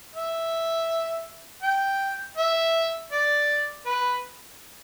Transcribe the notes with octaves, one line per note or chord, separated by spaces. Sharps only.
E5
G5
E5
D5
B4